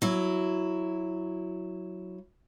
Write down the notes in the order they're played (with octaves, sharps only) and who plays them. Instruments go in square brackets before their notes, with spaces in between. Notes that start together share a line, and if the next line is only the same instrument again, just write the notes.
[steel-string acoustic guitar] F#3 E4